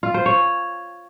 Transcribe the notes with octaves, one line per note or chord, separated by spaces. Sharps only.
F4
C5
C#5